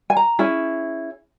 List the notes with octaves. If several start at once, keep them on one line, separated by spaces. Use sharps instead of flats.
G#5
A#5
C#4 E4 G#4